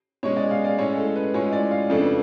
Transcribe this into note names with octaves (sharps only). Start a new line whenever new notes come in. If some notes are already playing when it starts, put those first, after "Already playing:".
B2 G#3 C#4 C#5
D5
F5
D5
A2 G#3 C#4 C#5
A4
B4
A2 G#3 C#4 F4 C#5
D5
F5
F2 C#3 F3 A3 D4 A4
B4